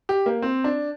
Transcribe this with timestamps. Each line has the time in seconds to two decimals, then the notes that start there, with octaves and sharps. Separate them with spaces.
0.09 G4
0.26 A#3
0.42 C4
0.64 D4